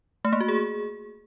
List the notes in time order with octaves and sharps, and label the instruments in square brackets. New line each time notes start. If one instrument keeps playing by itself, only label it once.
[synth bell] A3
A#3
F#4
G#4